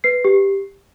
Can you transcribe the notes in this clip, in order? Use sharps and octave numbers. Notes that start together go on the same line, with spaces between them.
B4 C7
G4